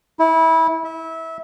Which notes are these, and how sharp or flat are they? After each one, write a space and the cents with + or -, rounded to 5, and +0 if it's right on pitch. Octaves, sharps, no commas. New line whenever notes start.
E4 -25
E5 -25